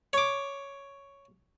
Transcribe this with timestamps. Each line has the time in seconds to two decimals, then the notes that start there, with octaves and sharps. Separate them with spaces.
0.13 C#5 D6